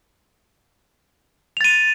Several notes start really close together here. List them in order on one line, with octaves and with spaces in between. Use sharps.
F7 A6 D#7